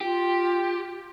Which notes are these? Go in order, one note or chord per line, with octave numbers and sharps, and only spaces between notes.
F4 G4